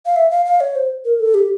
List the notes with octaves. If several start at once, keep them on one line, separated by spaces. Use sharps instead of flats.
F5
E5
F5
F5
C#5
C5
A#4
A4
G4